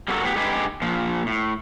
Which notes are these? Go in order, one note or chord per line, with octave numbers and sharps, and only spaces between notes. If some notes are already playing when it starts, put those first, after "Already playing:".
G3 A#3 C#4 F#4 A4 A#4
A2 F#3 B3 G4
D3 G#3 D#4 G4 G#4 B4
A#2 F3
A2